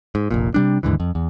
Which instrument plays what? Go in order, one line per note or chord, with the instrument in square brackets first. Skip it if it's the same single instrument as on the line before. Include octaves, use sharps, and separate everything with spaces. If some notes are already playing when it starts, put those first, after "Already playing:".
[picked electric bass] G#2
F1 A#1 A#2
C3 G3 D4
D#2 G#2 D3 E3
F2
E2